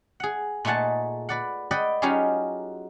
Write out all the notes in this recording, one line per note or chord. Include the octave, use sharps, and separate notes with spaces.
G#4 F#5
A#2 A3 D#4 G#4 F#5 A5
B4 D5 F#5
B4 D5 D#5 F#5 G5
F#3 C#4 D#4 F4 G4 G#4